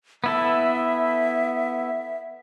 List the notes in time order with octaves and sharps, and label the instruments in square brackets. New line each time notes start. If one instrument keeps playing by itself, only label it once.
[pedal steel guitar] B3 E4 A4 [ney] E5